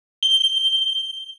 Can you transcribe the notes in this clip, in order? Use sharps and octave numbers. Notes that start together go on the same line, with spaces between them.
G7